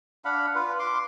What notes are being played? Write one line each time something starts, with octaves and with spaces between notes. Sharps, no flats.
D4 F5 F#5 B5
F4 B4
C6 D6